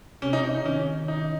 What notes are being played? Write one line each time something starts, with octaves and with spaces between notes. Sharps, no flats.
C3 C#4
D#4
C#4
D#4
D#3 C#4
D#4